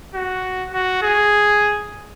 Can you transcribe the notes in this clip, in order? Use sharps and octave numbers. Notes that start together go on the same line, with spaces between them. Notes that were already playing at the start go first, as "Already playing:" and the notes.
F#4
F#4
G#4